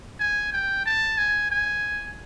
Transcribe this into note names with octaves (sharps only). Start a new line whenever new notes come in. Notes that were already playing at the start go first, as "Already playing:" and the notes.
G#5
G5
A5
G#5
G#5